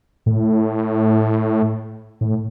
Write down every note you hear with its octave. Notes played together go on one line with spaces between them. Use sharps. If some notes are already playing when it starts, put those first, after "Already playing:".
A2
A2